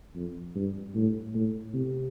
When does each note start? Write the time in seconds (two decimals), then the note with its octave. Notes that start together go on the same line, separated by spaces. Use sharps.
0.15 F2
0.55 G2
0.95 A2
1.35 A2
1.74 C3